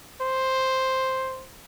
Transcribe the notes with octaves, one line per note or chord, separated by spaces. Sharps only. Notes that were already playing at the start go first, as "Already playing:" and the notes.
C5